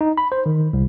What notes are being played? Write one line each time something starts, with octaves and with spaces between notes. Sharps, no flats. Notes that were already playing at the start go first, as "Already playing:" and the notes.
D#4
B5
C5
D#3
C2